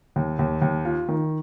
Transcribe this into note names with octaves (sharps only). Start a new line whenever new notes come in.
D#2
D#2
D#2
F4
D#3